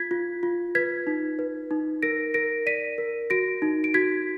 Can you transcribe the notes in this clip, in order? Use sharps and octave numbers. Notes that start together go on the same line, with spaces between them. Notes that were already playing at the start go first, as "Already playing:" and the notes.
Already playing: F4 G#6 B6
F4
F4
B4 G#6 B6
D#4
B4
D#4
A#4 A#6 D7
A#4 A#6 D7
D5 B6 D#7
A#4
F#4 A#6 D7
D#4
D7
F#4 G#6 B6